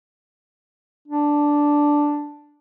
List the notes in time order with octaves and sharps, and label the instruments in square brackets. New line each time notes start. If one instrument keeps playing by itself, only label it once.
[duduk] D4